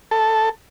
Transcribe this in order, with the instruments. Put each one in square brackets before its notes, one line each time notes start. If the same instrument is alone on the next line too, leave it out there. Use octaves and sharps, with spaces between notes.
[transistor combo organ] A4